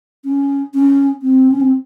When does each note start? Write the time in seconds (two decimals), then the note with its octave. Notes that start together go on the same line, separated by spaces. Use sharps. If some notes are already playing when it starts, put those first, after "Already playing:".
0.25 C#4
0.74 C#4
1.22 C4
1.51 C#4
1.61 C4